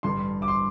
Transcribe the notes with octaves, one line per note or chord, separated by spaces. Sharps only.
A1 G2 D3 C6
D6
C6